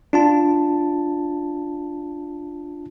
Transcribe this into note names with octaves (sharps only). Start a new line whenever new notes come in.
D4 F4 A5